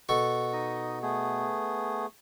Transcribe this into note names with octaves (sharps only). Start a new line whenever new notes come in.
B2 A4 C#6
D#4 D#5
A3 B3 G#4